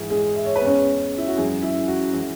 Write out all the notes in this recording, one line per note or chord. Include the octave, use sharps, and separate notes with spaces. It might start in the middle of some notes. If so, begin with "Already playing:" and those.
Already playing: G#2 E3 G#3
G#3 G#4
E5
C#5
B4
E2 C#3 G#3 C#4 C#5
E4
F#4
F#2 E3 G#3 G#4
E4
F#4
E3 G#3